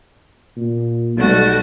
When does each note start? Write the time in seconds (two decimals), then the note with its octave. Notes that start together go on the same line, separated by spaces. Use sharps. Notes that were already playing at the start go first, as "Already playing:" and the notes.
0.57 A#2
1.17 B1 G3 A3 F#4